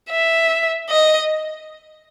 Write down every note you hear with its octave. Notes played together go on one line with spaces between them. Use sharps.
E5
D#5